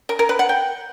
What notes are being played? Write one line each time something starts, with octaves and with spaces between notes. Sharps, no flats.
A#4
A#4
B4
F#5
G5